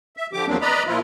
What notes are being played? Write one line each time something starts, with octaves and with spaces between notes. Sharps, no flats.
E5
D3 F3 G4 D6
E2 F3 F#3 A#3 C4 D4
B4 D5 D#5 A#5 B5
A#2 F3 E4 F4